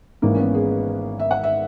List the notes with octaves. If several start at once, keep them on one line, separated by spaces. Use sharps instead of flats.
G#1 G#2 E3 A#3
C#4
B3
G#4
E5
F#5
E5